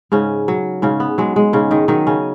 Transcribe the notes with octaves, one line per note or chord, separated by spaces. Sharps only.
G#2 C#3 C#4
F#3
G#2 C#3 C#4
B3
F#3 G#3
G#3
G#2 C#3 C#4
D#3 D#4
D#3 F#3 D#4
C#3 C#4